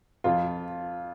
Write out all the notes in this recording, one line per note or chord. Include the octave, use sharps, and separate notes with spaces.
F2 F4